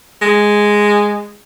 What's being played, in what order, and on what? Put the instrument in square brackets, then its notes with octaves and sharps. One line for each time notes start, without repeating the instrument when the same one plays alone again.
[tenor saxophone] G#3